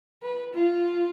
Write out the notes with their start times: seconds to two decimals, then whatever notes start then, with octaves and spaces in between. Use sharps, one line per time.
0.23 B4
0.54 F4